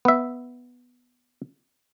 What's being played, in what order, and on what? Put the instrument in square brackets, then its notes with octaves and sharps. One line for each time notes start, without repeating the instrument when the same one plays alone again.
[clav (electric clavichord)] B3 E5